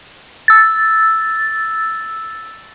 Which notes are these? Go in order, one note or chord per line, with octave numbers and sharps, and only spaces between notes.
E6 A6